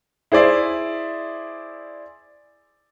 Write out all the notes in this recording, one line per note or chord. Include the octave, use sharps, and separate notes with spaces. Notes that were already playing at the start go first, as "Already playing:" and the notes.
E4 G#4 C5 D5 E5